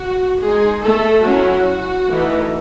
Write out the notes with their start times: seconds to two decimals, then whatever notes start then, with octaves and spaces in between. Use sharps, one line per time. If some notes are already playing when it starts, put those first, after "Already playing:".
Already playing: F#4
0.40 G#3 D#4 G#4
0.82 A3 A4
1.24 F#3 C#4 E4 F#4
2.08 E3 A3 D#4